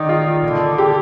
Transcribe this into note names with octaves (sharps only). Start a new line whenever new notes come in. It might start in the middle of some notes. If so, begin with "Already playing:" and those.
Already playing: D#3 D#4 D5
F4
D3
G4